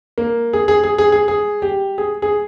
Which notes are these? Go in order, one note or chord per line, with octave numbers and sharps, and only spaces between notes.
A#3
G#4
G#4
G#4
G#4
G#4
G#4
G4
G#4
G#4